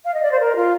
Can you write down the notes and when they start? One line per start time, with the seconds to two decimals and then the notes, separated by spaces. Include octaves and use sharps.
0.04 F5
0.14 D#5
0.22 D5
0.31 C5
0.40 A#4
0.55 F4